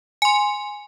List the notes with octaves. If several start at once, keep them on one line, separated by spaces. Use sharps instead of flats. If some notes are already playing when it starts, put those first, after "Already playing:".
G#5 C6